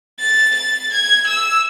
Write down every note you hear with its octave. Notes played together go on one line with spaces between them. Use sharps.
A6
A6
G#6
E6